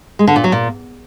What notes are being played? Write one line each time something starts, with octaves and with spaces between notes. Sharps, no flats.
G#3
D3
A#2
F#3
A#2